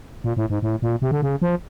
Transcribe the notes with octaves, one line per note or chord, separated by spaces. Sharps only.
A#2
A2
G#2
A2
A#2
C3
D3
C#3
F3